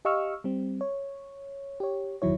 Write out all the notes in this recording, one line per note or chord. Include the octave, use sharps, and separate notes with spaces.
G4 D#5 F5 C#6 E6 F6
G3 C4
C#5
G4 C#5
G1 E2 D#3 F#3 E4 C#5